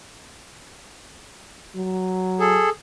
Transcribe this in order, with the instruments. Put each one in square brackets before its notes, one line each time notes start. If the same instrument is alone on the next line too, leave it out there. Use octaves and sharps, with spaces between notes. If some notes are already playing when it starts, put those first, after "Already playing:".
[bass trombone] F#3
[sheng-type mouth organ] G#4 A4